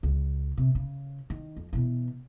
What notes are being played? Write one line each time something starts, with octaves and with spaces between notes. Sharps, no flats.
C#2
C3
C#3
D#3
F2
B2 E3